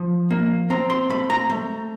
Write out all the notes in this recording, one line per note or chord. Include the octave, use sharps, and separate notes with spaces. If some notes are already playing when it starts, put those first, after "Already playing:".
Already playing: F3
A#3
C4 A#5
C6
A3 B5
A#5
A3